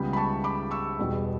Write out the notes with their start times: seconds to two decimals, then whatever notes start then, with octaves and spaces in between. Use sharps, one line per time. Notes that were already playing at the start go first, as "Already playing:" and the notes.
Already playing: C#2 C#3 G3 B3 G5 B5
0.13 B5
0.16 A5 C#6
0.44 B5 D6
0.71 C#6 E6
0.98 E1 E2 B2 G3